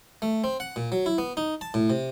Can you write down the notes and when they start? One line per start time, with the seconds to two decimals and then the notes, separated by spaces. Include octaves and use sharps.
0.22 A3
0.44 C4
0.60 F#5
0.76 A#2
0.92 F#3
1.06 E4
1.18 B3
1.37 D#4
1.61 A5
1.74 A2
1.90 C3